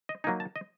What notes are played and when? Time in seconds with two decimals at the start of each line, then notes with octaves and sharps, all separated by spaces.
0.09 D#5
0.24 F#3 A#3 D#4 G#5
0.40 A5
0.56 D#5